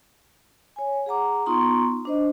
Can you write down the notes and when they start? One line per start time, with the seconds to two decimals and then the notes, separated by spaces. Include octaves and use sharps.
0.76 C#5 G#5
1.06 G#4 F#5 A#5 D6
1.46 B3 D#4 F4 A#5 C6 C#6
2.05 D4 C5 D#5